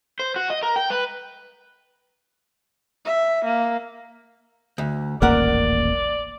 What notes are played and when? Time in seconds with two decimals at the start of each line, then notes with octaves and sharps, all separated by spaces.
0.20 C5
0.36 F#4
0.50 D#5
0.63 A#4
0.76 G5
0.90 B4
3.05 E5
3.44 A#3
4.78 D2
5.22 D#1 A1 A#3 A#4 D5 F#5